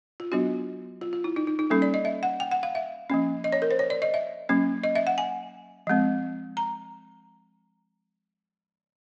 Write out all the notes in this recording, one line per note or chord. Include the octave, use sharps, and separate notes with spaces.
F4
F#3 B3 D4 F#4
F4
F4
E4
D#4
D#4
D#4
G3 A#3 C#4 A4
D5
D#5
E5
F#5
G5
F#5
F5
E5
F3 A#3 C#4
D#5
C#5
A#4
C5
C#5
D5
D#5
E5
F#3 A#3 C#4
D#5
E5
F#5
G#5
F3 G#3 C4
A#5